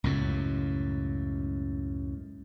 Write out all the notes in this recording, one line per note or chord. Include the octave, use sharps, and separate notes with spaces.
C#2 F#2 A2